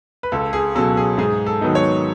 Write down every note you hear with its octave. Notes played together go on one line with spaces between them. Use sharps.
B4
C#2 A4
G#4
B2 F#3 C#4 A4
G#4
G#2 G#4
A4
D#3 F#3 B3 D#4
C#5